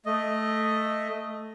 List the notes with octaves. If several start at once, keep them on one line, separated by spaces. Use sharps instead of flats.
A3 D#5